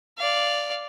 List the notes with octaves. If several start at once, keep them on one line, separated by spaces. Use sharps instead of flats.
D5 F5